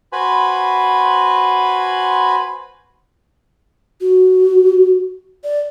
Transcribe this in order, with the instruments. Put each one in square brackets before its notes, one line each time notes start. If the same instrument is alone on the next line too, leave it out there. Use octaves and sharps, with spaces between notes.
[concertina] F#4 B4 C5 G#5 B5
[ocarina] F#4
D5